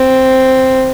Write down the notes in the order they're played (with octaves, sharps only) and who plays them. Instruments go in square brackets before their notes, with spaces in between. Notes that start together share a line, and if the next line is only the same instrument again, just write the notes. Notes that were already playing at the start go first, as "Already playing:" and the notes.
Already playing: [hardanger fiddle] C4